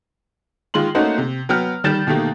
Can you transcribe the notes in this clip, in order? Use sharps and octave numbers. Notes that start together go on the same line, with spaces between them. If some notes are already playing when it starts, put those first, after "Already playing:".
D#3 G#3 F4 C6 F#7
A3 A#3 C#4 D#4 F#4 C5
C3
F#3 B3 G5 F6
D#3 G3 G6 A6 E7
B2 D#3 A3 A#3 G4